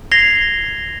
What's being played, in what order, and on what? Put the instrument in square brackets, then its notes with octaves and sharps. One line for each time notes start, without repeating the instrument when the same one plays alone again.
[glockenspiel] G#6 A#6 C7 F7 G7